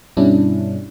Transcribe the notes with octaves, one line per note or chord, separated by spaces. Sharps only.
G2 B2 G3 C#4 D4 E4